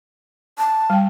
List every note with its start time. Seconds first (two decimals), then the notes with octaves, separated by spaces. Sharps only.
0.58 A5
0.90 G3 G5